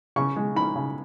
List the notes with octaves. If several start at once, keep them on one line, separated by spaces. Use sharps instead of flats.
C#3 C#6
G#3
D#4 B5
C#3